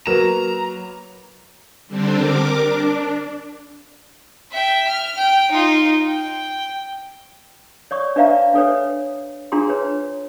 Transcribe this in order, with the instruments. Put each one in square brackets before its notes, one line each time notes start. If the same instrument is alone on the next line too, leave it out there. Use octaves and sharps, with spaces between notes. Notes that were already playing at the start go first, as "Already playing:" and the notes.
[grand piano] F#3 A#4 E7 [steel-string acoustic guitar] A#3 B4 [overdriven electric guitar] A#5
[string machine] D3 G3 C4 D4
A#4 D6
D4
[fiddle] E5 G5
F6
G5
D#4 F4
G5
[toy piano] C#5 D5 C#6
D4 B4 D5 E5 F5 A#5
D4 A4 B4 C#5
D4 F4 G#4 A#5 C6
B4 C#5